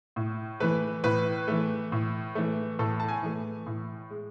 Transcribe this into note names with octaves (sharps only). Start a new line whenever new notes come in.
A2
E3 A3 B4
A2 B4
E3 A3
A2
E3 A3
A2 A4
A5
G#5
E3 A3
A2
G#3